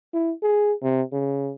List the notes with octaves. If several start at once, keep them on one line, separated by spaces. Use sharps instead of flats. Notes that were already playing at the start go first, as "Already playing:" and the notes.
E4
G#4
C3
C#3